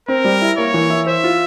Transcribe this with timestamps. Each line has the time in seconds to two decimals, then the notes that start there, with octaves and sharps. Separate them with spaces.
0.08 C4 A#4
0.25 G3
0.42 E4
0.58 A#3 C#5
0.74 E3
0.90 E4
1.07 C5 E5
1.24 F4